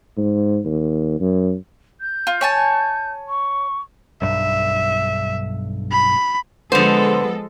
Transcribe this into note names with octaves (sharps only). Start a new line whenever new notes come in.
G#2
D#2
F#2
G6
F4
C#5 G#5 A5
C#6
B1 G2 E5
B5
D3 F3 G#3 B3 A4 C5